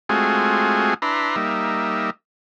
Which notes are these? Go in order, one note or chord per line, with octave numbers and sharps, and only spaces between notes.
G#3 A3 C4 F4 F#4 G#4
D4 E4 B4 A#5 C6
G3 A#3 D#4 E5